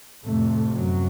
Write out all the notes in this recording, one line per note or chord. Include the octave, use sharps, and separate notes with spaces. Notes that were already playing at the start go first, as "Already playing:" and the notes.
F2 A2 C3 A3
F#2 F#3